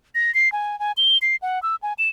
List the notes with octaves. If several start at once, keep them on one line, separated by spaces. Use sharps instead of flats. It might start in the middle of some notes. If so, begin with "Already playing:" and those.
A#6
C7
G#5
G#5
G7
C7
F#5
E6
G#5
E7